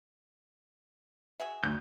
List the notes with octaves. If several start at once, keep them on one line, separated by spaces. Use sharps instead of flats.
F#4 G#4 E5
D2 G6